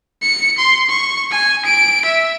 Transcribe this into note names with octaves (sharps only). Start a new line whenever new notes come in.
C#7
C6
C#6
G#5
D7
E5